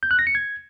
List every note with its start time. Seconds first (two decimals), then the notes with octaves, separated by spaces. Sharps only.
0.03 G6
0.11 F#6
0.19 A#6
0.27 C#7
0.35 G#6